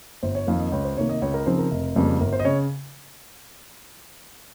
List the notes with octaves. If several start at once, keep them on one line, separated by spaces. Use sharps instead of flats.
G1 C5
C#5
F2 D#3 A#3 F5
D#5
C#2 C#5
C5
C3 D#3 A#3 C#5
D#5
C#2 C#5
A#4
C#3 F3 C4 D#4 C5
A#4
F1
F2 C#3 G3 A#3
G1 A#4
C5
D#5
C#3 C#5